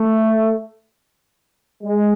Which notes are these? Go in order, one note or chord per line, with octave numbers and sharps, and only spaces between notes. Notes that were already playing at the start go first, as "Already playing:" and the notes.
Already playing: A3
G#3